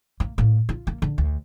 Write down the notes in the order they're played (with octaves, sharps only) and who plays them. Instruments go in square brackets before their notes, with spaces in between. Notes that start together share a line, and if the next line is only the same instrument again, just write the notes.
[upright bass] A#3
A2 A#3
F4
A#3
D3
D2